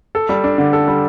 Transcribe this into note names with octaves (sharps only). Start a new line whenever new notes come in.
A4
G3
D4
D3
A4
G3